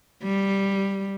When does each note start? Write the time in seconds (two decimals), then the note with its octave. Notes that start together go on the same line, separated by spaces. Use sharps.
0.23 G3